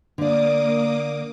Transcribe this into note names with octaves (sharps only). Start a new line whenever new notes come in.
D3 A#3 D5 D6 D#6